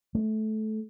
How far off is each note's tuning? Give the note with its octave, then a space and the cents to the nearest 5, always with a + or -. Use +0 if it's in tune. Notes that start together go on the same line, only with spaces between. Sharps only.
A3 -20